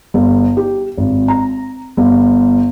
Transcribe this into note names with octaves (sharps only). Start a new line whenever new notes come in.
G1
G4
G#1
A#5
G1